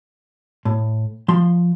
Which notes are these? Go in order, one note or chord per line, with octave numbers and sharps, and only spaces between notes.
A2
F3 C6